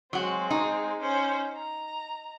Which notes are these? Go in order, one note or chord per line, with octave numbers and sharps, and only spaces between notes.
F#3 G#3 C4 F#4
D#4
C#4 C5
A#5